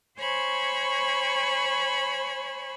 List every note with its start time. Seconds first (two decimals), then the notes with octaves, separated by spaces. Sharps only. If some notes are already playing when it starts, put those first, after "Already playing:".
0.18 C5 C#5 G#5 B5 C#6